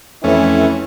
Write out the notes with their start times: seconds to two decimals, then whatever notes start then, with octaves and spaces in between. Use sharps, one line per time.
0.24 F2 E3 A3 C#4